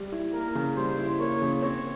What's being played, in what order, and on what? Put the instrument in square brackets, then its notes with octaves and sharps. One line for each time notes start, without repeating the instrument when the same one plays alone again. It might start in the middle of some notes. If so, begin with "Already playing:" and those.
Already playing: [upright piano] G3
E4
[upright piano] A#3 [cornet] A#4
[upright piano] C#3
[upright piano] G3 [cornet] C5
[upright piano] E4
[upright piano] A#3 [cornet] C#5
[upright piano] C#3
[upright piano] C4 [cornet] C#5